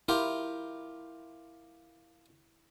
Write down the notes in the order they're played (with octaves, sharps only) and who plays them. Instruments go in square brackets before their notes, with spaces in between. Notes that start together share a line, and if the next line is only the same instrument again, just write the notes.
[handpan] E4 [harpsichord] F4 G4 A#4